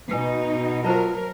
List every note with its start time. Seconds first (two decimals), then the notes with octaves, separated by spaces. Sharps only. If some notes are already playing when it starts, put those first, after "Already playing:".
0.11 B2 D#4 B4 G#5
0.85 F#3 F4 A#4 C5 D#5 A5 A#5